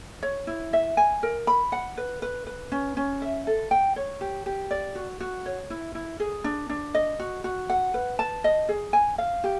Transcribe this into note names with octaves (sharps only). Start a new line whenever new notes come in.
C#5
E4
E5
G#5
A#4
B5
F#5
B4
B4
B4
C#4
C#4
E5
A4
G5
C#5
G4
G4
D5
F#4
F#4
C#5
E4
E4
G#4
D4
D4
D#5
F#4
F#4
F#5
B4
A5
D#5
G#4
G#5
F5
G4